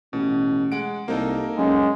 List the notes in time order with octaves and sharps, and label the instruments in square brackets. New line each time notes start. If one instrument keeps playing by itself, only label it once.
[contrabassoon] A1 [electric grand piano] B2
[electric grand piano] G#3 F#5 D7
[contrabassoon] C2 [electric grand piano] A#3 D#4 A4
[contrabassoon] F#2 [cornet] G#3